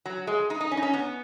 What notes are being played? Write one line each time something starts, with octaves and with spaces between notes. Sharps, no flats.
F#3
G#3
D#4
D#4
C#4
D#4
C#4
B3